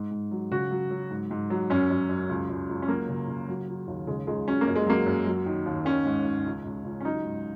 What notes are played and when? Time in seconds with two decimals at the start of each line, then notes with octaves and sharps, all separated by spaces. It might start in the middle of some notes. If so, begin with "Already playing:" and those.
Already playing: G#2
0.11 G#2
0.31 F#3
0.51 C#3 F#4
0.71 F#3
0.91 F#3
1.11 G#2
1.31 G#2
1.50 F#3
1.70 F#2 C#4
1.90 F#2
2.09 F#2
2.29 C#2
2.50 C#2
2.69 C#2
2.82 C#4
2.88 F#3 A#3
3.08 C#3
3.28 C#3
3.48 F#3
3.68 F#3
3.88 D#2
4.07 C#3 G#3
4.27 C#2 G#3
4.47 F#3 C#4
4.61 A#3
4.67 F#2
4.76 G#3
4.87 F#3 A#3
5.06 F#2
5.26 F#3
5.46 D#3
5.66 D#2
5.85 D#3 C#4
6.05 G#2
6.26 G#2
6.46 C#2
6.65 C#2
6.85 C#2
7.00 C#4
7.05 F#3 D#4
7.25 G#2